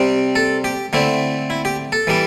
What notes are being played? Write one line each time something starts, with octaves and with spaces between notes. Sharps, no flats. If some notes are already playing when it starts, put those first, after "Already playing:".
Already playing: C3 G3 C4
A4
G4
D3 A3 C4 E4
E4
G4
A4
E3 G3 D4